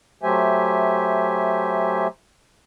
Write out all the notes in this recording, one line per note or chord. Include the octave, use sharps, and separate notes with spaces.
F#3 A3 G4 C5 E5 G#5